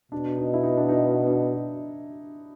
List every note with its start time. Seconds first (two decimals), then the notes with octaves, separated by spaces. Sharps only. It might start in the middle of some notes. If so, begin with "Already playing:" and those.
0.11 B2 D4
0.37 D#4
0.54 E4
0.63 D#4
0.77 D4
0.89 D#4
1.28 D4